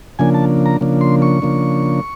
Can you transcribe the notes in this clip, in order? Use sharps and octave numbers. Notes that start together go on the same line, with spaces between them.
C#3 F3 A#3 D4 G#5
A5
A#5
C#3 F3 A#3 D4
C6
C#6
C#3 F3 A#3 D4